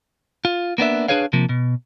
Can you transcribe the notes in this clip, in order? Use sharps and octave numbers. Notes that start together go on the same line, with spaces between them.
F4
A#3 B3 D4 E5
D4 E4 G#4 B4 C#5 F5
C3 F3 A#3
B2